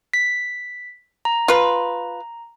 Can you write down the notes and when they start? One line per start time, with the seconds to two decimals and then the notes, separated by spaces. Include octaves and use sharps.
0.14 B6
1.25 A#5
1.48 F4 B4